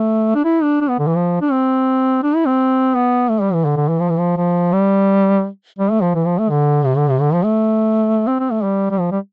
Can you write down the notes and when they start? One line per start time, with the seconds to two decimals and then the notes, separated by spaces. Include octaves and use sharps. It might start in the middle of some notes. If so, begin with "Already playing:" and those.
Already playing: A3
0.35 D4
0.45 E4
0.63 D4
0.81 D4
0.89 B3
0.99 D3
1.07 E3
1.16 F3
1.41 D4
1.52 C4
2.23 D4
2.36 E4
2.46 C4
2.95 B3
3.30 A3
3.41 G3
3.54 E3
3.65 D3
3.77 D3
3.89 E3
4.00 F3
4.09 E3
4.19 F3
4.37 F3
4.73 G3
5.79 G3
5.91 A3
6.02 F3
6.15 E3
6.26 F3
6.39 A3
6.50 D3
6.85 C3
6.97 D3
7.10 C3
7.21 D3
7.34 F3
7.45 A3
8.27 C4
8.40 C4
8.52 A3
8.63 G3
8.91 G3
8.99 F3
9.11 G3